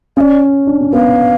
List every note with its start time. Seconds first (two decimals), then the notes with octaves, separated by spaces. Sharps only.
0.17 C#4 D5 F5
0.67 D4
0.81 C#4
0.93 B3 F5